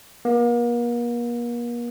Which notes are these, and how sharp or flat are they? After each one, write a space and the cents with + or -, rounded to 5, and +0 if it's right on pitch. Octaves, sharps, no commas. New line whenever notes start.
A#3 +40